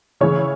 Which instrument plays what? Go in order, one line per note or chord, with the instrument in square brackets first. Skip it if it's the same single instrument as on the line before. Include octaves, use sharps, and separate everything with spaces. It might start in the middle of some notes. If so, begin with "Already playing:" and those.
[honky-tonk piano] C#3 E3 C#5